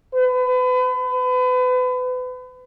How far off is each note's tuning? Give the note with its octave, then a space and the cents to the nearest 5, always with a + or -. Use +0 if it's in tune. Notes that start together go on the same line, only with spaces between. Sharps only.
B4 +35